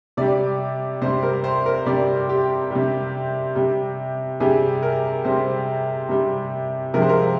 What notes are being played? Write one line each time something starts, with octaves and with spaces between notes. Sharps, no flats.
C3 G3 D5
C3 G3 C5
A#4
C5
A#4
C3 G3 D5
G4
C3 G3
C3 G3
C3 G3 G#4
A#4
C3 G3 C5
C3 G3
C3 F3 G#3 A#4
C5
A#4